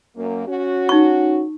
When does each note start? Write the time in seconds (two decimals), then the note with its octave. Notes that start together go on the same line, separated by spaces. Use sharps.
0.17 F#2 A#3
0.47 C#4 F#4
0.89 D#4 C#6